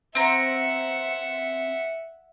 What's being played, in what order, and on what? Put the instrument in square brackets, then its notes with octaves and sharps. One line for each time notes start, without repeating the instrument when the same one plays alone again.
[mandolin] C4 A#5 [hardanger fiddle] E5 F#5